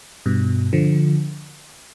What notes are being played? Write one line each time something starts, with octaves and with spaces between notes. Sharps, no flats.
G2 B2
D3 F3